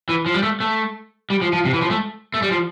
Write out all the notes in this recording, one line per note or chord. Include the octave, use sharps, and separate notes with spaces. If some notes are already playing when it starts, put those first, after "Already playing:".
E3
F3
G3
A3
A3
G3
F3
F3
C3
E3
F3
A3
A3
G3
F3